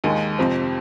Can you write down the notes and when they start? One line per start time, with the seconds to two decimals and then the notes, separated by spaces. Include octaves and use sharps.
0.04 D#2 D#3 G#3
0.39 F2 C3 F3 C4